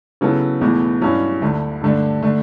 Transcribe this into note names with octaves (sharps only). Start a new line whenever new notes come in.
C#3 F#3 B3 E4 A4
E2 B2 A3 E4
G2 F#3 C#4 E4
D2 D3 A3
G2 D3 A3 D4
D3 A3 D4